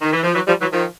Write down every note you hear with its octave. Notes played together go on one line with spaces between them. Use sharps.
D#3
E3
F3
E3 F#3
F3 G3
E3 F#3
D#3 F3